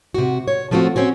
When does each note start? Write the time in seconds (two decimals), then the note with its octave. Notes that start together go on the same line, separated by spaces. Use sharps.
0.14 C3 F#4
0.48 C#5
0.71 F3 A3 C4 F4 F#4
0.96 C4 C#4 F#4